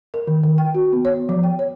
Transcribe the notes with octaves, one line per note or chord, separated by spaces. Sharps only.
A#4
D#3
D#3
G5
F#4
B3
C#5
F3
G5
C#5